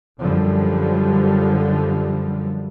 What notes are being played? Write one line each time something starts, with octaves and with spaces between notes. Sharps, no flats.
F#2 D3 F3 G3